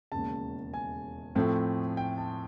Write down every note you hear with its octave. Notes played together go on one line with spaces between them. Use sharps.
E1 D#2 C#3 A5
G#5
A2 F3 A3 C4
G5
A5